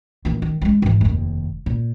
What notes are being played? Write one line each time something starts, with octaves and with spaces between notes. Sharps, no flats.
A#1 E3
D#3
F3 G#3
G#2 E3
F1 D#2
A#2